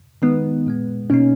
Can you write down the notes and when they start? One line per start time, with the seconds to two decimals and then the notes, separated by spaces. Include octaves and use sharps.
0.22 D#3 G#3 B3 D#4
0.67 A#2 G#3 B3
1.10 B2 A#3 C#4 D#4